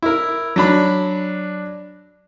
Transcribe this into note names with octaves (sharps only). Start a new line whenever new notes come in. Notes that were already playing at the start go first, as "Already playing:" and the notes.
E4 A#4
F#3 D4 B5